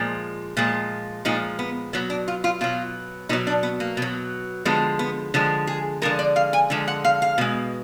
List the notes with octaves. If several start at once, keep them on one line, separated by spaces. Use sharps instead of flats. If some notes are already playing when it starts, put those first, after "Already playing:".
Already playing: A#2 F3 G#3
A#2 F3 G#3
A#2 F3 G#3 D#4
B3
B2 F#3 B3
D4
F4
F4
B2 F#3 F4
B2 F#3 D#4
D4
B3
A#3
B2 F#3
D3 F3 G#3 B3
B3
D3 F3 G#3
G#4
D3 F3 G#3 A#4
D5
F5
G#5
D3 F3 G#3
F#5
F5
F5
B2 G#3